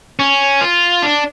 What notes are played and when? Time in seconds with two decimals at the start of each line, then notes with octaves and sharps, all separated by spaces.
0.19 C#4
0.61 F4
1.03 D4